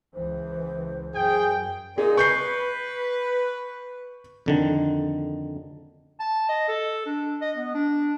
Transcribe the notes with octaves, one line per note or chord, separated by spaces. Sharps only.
C#2 E3 C5
F#2 G#4 G5
A#2 D#4 G#4
B4 C#6 G6 C7
F2 D3 D#3
A5
D#5
A4
D4
D#5
B3
D4